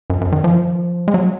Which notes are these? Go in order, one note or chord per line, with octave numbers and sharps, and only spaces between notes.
F#2
F#2
D#3
F3
G#3
F#3